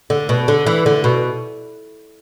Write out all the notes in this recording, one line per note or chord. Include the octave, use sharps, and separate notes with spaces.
D3
B2
D3
E3
D3
B2